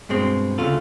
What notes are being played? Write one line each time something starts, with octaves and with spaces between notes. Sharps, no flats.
G2 B2 G#3 C4
D2 C#3 F4 A4